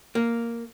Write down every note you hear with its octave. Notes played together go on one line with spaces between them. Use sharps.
A#3